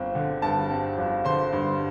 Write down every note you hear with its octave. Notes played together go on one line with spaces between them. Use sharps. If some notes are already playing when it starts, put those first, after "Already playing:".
Already playing: G1 C4
D3
G2 A5
C4
G1
D3 C5 C6
G2